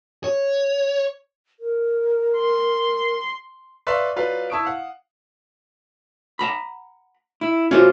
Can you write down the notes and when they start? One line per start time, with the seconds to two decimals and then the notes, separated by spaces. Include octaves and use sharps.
0.24 C#5
1.60 A#4
2.37 C6
3.87 B4 D5 E5 F5 C6 C#6
4.16 F#3 F4 B4 D5 F5
4.50 E4 A5 C#6 D#6 D7
4.65 F5 F#5
6.39 F#5 A#5 B5
7.41 E4
7.71 C#4 F4 F#4 C5